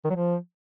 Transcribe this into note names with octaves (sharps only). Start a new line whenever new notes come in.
D#3
F#3
F3